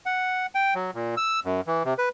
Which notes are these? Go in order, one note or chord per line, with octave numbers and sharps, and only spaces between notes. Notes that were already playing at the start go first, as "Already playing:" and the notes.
F#5
G5
F#3
A#2
E6
F#2
E3
C3
B4